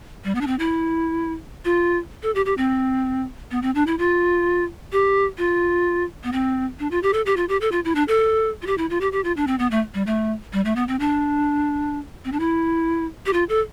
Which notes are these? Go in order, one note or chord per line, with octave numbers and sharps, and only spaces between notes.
G3
B3
D4
C4
E4
F4
A4
G4
G4
C4
B3
C4
D4
E4
F4
G4
F4
B3
C4
D4
F4
G4
A4
G4
F4
G4
A4
F4
E4
D4
A4
F4
G4
E4
F4
G4
G4
F4
D4
C4
B3
A3
G3
A3
G3
A3
B3
C4
D4
C4
D4
E4
G4
F4
A4